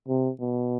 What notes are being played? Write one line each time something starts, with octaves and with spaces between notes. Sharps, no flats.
C3
B2